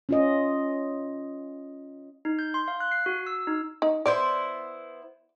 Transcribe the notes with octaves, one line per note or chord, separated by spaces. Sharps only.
C#4 F4 D#5
D#4
G6
C6
F5
F#6
C7
F#4
E6
D#4
D#4
B3 E4 C5 D5